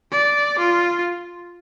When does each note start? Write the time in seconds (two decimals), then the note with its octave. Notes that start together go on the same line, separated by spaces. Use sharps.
0.11 D5
0.59 F4